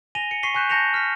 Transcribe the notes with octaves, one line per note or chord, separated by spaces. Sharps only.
G#5 A#6 D#7 F7 G7
C#7
C#6 B6 C7 D#7 G7
G#5 C#6 F#6 G6 B6 E7
A5 G6 A#6 C#7 E7 F7
F6 B6